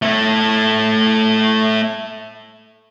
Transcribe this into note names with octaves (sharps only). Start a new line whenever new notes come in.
A3 E4